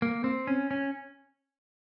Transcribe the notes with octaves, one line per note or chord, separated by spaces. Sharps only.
A#3
C4
C#4
C#4